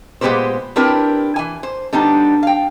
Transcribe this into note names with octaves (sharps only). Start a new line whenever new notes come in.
A#2 G#3 B3 G4 B4 C5
C4 D4 E4 G4 A#4 B4
E3 G#5
C5
D3 G3 B3 D4 D#4
F5 G5